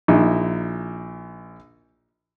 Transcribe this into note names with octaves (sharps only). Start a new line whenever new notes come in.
A#1 D#4 E4